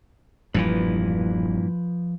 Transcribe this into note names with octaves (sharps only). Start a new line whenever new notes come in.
E1 G2 A#2 E3 F3 B4